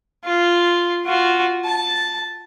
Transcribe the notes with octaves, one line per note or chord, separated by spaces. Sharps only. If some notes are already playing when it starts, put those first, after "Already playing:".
F4
F4 F#4
A5